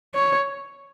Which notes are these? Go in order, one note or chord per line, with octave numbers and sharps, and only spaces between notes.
C#5